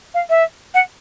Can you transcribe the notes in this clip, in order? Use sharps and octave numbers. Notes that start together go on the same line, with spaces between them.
F5
E5
F#5